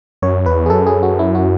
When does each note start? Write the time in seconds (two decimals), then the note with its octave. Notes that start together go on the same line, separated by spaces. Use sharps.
0.22 F#2 C#5
0.46 E2 B4
0.66 G#4
0.70 F#2 A4
0.87 G#4
1.03 F#4
1.19 E4
1.35 F#4